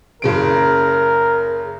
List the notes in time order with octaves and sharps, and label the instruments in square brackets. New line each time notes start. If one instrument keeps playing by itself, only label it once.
[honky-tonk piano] F#1 C#3 D7 [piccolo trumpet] A#4